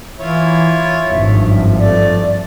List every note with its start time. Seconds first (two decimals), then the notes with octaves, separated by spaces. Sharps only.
0.19 E3 E4 F4 C#5
1.08 G#1 G2 F3 E5
1.79 A3 D5